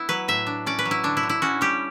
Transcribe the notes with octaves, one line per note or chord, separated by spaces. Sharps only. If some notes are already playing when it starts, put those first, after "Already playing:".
Already playing: B3 E4
F#3 B4
A2 E5
D4
C#4 D5
B4
F#3
E4
D3 D4
E4
D3
E4
C#4 F#4
G3 G4